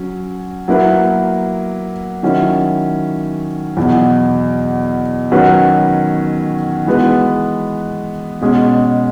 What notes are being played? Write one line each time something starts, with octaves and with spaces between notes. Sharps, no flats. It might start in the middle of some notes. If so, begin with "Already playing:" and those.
Already playing: F#3 C#4
F#3 A#3 E4 B4
D#3 F#3 C#4 E4
E2 B2 F#3
D#3 F#3 C#4 F#4 B4
E3 G#3 B3 F#4 B4
B2 G#3 C#4 G#4